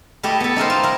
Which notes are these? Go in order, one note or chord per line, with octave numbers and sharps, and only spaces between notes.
A3 E4 G4 D#5
B3 A4
D#4 E4 A#4 C5
F4
E4 A#4